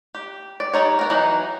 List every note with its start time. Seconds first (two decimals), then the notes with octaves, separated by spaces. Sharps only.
0.15 G4
0.60 D5
0.73 G3 D#4 C#5
0.99 B3 A#4
1.10 E3 F#3 D#4